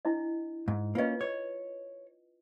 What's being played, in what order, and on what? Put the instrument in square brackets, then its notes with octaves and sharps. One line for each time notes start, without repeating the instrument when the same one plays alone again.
[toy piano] D4 E4 D#5
[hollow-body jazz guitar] G#2
[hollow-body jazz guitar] A#3 C#4 [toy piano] F4 B4 D#5
[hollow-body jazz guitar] C#5